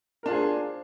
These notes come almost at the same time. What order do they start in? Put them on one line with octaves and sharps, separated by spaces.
A#4 D4 F4 G#4 C5